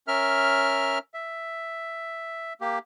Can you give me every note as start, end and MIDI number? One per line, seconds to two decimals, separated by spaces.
0.08 0.99 61
0.08 0.99 70
0.08 0.99 76
0.08 0.99 89
1.14 2.53 76
2.61 2.79 58
2.61 2.79 67